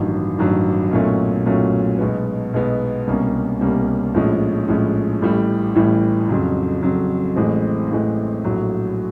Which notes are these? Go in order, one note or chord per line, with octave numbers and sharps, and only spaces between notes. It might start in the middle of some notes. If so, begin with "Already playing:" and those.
Already playing: A1 G2 D#3 F#3
A1 G2 D#3 F#3
B1 A#2 F#3 A3 C#4
B1 A#2 F#3 A3 C#4
B1 B2 G#3 B3
B1 B2 G#3 B3
C2 B2 G3 A#3 C#4
C2 B2 G3 A#3 C#4
A#1 A2 F3 G#3 C#4
A#1 A2 F3 G#3 C#4
A1 A2 E3 G3
A1 A2 E3 G3
F2 C#3 F#3
F2 C#3 F#3
A1 A2 E3 G#3 C4
A1 A2 E3 G#3 C4
A#1 A2 F#3